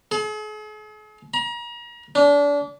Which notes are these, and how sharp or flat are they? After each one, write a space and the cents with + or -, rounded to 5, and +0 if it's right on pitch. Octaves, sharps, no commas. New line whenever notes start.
G#4 +45
A#5 +35
D4 -30